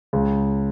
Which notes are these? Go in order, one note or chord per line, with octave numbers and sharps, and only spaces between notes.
C#2